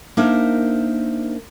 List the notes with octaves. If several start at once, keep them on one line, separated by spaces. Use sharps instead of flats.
A#3 D4 D#4 A#4 C5 E5